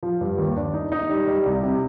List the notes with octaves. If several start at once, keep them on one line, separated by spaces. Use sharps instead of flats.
F3
G2
D#2
D4
D#4
D#4
G3
G3
C2
C3